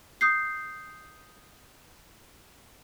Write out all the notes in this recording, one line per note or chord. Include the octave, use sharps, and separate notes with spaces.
D#6 G6 C7